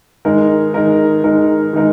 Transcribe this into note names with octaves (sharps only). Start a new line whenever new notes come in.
D#3 G#3 D#4 A#4
D#3 G#3 D#4 A#4
D#3 G#3 D#4 A#4
D#3 G#3 D#4 A#4